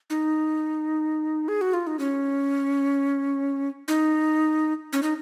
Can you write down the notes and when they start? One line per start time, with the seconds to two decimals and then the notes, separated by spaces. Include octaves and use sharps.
0.10 D#4
1.48 G#4
1.61 F#4
1.73 F4
1.87 D#4
1.99 C#4
3.88 D#4
4.93 C#4
5.03 D#4